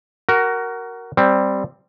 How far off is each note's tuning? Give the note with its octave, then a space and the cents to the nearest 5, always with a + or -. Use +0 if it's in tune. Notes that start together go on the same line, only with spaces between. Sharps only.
F#4 +20 A#4 +0
G3 +0 C4 +0